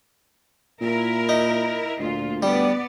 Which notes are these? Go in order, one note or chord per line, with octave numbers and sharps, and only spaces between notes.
A#2 E4 A#4
D#4
D2 A#2 F4
G3 B3 D5